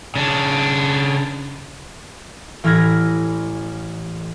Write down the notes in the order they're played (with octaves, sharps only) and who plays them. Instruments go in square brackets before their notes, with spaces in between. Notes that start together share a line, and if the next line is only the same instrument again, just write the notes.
[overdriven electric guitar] C#3 D4
[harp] A1 E3 B5 F6 G#6 A#6